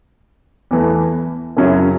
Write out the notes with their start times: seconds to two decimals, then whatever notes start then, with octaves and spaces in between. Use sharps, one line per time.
0.71 E2 E3 A3
1.57 F#2 C#3 F#3 C#4 E4